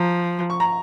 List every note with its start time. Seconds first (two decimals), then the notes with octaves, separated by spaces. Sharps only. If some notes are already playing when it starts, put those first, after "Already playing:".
Already playing: F3 A#5
0.50 C#6
0.60 A#5